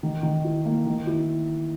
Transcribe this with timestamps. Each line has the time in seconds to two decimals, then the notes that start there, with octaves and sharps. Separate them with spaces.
0.03 D#3
0.23 D#3
0.44 E4
0.65 A#3
0.86 D#3
1.07 E4